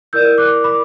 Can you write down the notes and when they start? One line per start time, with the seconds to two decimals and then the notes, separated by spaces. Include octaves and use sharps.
0.13 E4 A#4 D5 E6 G6
0.38 D6 F#6
0.64 B5 D6